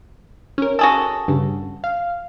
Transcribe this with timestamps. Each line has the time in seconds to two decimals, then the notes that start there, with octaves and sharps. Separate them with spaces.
0.58 C#4 A#4
0.79 F#4 G#4 A4
1.28 G2 C#3
1.84 F5